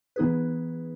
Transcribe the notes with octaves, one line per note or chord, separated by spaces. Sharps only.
E3 B3 D#4 G#4 B4